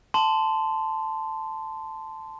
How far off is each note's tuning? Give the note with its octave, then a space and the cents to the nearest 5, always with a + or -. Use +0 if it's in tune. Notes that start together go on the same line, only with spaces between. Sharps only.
A5 +0 C6 -15